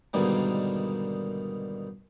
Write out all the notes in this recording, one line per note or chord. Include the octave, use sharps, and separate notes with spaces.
G#2 B2 D3 D#3 G3 A#3